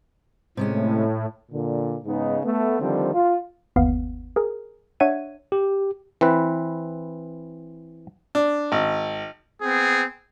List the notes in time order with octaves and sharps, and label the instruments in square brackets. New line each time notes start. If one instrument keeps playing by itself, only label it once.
[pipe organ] A2 [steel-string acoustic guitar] C3 G#3 C#4
[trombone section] A#2 D3
G#2 C#3 B3 D#4
A3 B3
D3 D#3 F3 G3 C4
F4
[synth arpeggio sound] G1 D#2 B3 F5
G#4 A#4
D4 C#5 E5 F#5 G#6 D#7
[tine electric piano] G4
[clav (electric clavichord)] E3 C4 B4
[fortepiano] D4
G#1
[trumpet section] B3 C4 G#4